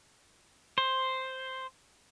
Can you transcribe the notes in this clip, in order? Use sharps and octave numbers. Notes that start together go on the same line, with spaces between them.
C5